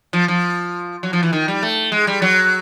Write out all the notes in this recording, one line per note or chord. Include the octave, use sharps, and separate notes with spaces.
F3
F3
F#3
F3
E3
D#3
G3
A3
G#3
G3
F#3